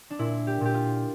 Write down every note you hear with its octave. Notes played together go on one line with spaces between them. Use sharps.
D4
A#2 E4
G4
A#2 G4
F4